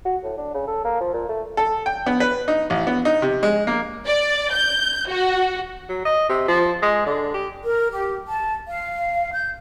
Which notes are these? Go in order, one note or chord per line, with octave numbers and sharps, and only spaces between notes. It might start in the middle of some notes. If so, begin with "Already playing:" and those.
F#4
A2
D4
C#3
A4
A#3
F3
A#2
A3
A4
G5
B3
B4
D#4
A1
B3
D#4
C3
G#3
A#3
D5
G6
F#4
F#3
D#5
C3
F3
G#3
D3
G4
A#4
G4
A5
F5
G6